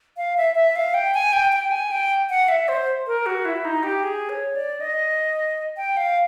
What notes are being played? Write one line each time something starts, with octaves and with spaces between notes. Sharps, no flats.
F5
E5
E5
F5
G5
G#5
G5
G5
G#5
G5
F#5
E5
C5
A#4
F#4
E4
D#4
G4
G#4
C#5
D5
D#5
G5
F5